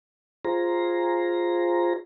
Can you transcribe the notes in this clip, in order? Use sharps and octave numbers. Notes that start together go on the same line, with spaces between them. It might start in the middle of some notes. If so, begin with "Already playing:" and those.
F4 G#4 C5 A#5